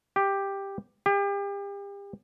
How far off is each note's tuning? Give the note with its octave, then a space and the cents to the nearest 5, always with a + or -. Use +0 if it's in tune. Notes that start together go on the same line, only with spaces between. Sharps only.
G4 +5
G4 +35